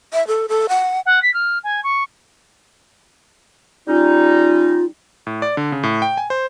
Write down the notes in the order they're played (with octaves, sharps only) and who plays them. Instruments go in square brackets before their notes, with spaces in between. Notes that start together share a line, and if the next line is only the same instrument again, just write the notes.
[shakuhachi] E5
A4
A4
F#5
[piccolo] F#5
B6
F6
G#5
C#6
[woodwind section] G3 C#4 D#4 [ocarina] F4
[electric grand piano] A2
D5
D3
C#3
A2
G5
G#5
C5